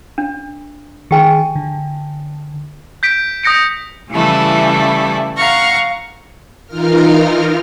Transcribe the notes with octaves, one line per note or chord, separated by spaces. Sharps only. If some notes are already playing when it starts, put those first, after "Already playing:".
D4
D#3 G4 G#4 G5 G#5
D3
G6 B6 D7
D#6 G6 A#6 C#7 D7
C#3 E3 G3 A3 E4
F5 F#5 A#5 C#6 F6
E3 D#4 F4 A#4 F6